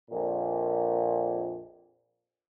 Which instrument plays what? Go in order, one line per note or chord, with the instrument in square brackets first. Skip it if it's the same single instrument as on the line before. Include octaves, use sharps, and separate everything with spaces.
[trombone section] A#1 F2 A#2